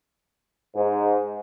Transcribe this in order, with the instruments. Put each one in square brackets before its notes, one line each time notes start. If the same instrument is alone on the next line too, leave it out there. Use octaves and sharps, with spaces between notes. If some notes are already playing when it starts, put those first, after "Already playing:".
[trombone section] G#2